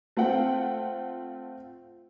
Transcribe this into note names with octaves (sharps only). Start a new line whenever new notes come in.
A3 C4 F4 F#5 G5